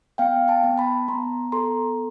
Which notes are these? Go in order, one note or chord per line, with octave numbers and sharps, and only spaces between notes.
B3 F5 G5
G5 A5
B3
A5 B5
B3 A#5 C6
A4 A#5 C6